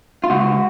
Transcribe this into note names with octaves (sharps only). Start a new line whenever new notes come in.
F4
C#2 F#4